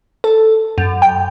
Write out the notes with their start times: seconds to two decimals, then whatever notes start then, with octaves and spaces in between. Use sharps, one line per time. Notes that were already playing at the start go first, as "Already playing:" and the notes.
0.24 A4
0.78 F#2
1.02 G5